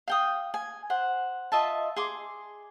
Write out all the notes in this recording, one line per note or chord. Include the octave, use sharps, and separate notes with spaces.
F5 G5 D#6
G#5
C5 F#5
F4 D#5 E5 A5
G#4 C6 D6